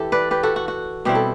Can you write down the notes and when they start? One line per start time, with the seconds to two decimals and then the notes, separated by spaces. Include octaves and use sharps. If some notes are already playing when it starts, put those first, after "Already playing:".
Already playing: E3 E4 G4 A4
0.12 B4 D5
0.31 G4 B4
0.43 F#4 A4
0.56 F#4
0.68 F#4
1.05 B2 G3 C4 E4 G4
1.15 A4